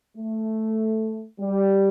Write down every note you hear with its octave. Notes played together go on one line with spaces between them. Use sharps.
A3
G3